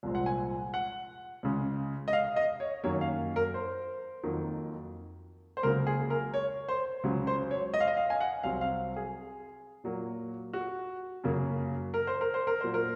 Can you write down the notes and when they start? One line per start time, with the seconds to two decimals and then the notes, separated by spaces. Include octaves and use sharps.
0.03 C2 A#2 F3 G#3 C4
0.15 F#5
0.26 G#5
0.74 F#5
1.43 C#2 C#3 G#3
2.08 D#5
2.13 F5
2.36 D#5
2.60 C#5
2.84 F#2 D#3 F#3 A#3 C#5
3.01 F5
3.36 A#4
3.54 C5
4.23 F2 D#3 F#3 A#3
5.57 C5
5.63 C#2 C#3 F#3 A#3 A#4
5.87 G#4
6.10 A#4
6.34 C#5
6.69 C5
7.04 C#2 C#3 F#3
7.27 C5
7.51 C#5
7.74 D#5
7.80 F5
7.87 D#5
7.97 F5
8.10 G#5
8.21 F#5
8.43 C2 C3 F#3 C4 F5
8.61 F5
8.96 G#4
9.84 A#2 F#3 A#3
10.53 F#4
11.24 F#2 C#3 F#3 A#3
11.94 A#4
12.07 C5
12.21 A#4
12.34 C5
12.47 A#4
12.60 A#2 F#3 A#3 C5
12.74 A#4